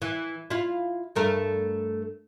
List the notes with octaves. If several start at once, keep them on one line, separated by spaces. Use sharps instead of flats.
E3
E4 F4
G2 A3 A#4